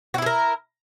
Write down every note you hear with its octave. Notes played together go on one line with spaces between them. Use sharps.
E4 F#4 G#4 A#4